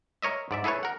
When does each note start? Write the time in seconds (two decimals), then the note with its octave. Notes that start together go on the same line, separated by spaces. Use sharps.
0.22 A#4 C#5 D#5 E5
0.51 G#2 D5 E5
0.64 E4 G#4 A4 B4 C#5
0.83 A#4 F#5